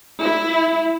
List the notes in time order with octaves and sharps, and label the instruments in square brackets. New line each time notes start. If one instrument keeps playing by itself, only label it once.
[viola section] E4